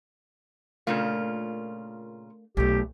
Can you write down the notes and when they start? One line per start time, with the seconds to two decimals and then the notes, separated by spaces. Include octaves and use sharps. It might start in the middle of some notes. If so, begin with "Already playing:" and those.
0.87 A#2 C#3 A3 A#3 D4 F4
2.57 B1 A#2 A3 G4